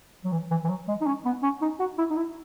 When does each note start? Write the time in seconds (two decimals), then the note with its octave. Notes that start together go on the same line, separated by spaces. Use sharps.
0.24 F#3
0.32 E3
0.51 E3
0.64 E3
0.69 F#3
0.88 G#3
1.01 D#4
1.06 C#4
1.25 B3
1.43 C#4
1.62 D#4
1.79 F#4
1.98 E4
2.10 D#4
2.16 E4